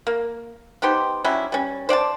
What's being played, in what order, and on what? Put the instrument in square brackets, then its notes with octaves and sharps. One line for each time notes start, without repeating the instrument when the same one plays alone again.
[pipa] A#3
B3 D#4 G4 C5
F#3 G3 C#4 E4
G3 C#4
C5 D5 F#5 A5